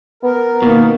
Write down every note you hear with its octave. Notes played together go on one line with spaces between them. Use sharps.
B3 A#4
B2 D#3 A#3